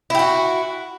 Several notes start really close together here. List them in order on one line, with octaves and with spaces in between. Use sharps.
E4 G4 F#4